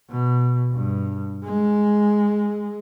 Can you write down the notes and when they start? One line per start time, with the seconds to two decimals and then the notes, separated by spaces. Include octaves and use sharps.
0.10 B2
0.73 G2
1.44 G#3